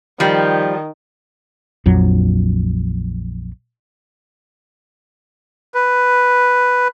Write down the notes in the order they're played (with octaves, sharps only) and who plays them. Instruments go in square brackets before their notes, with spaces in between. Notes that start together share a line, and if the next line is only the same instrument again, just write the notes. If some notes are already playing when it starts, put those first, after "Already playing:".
[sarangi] D#3 [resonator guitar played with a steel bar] F3 G3
[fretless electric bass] A#1 F2 F#3
[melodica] B4